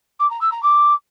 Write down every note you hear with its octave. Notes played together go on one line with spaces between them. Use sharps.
D6
A#5
E6
A#5
D6